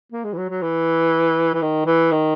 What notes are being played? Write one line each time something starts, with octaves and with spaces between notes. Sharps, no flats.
A#3
G#3
E3
F#3
F#3
E3
E3
D#3
E3
D#3